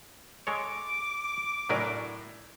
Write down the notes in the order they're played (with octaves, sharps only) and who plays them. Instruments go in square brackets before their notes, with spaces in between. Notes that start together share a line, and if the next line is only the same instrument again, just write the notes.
[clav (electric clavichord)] G#3 A4 C#5 [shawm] D6
[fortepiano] A2 D4 [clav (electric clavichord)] F#3 A#4 G#5